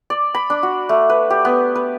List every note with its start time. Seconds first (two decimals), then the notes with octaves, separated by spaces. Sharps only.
0.10 D5
0.35 B5
0.50 D4
0.63 F#4
0.89 A3
1.09 B4
1.30 G4
1.45 B3
1.75 B4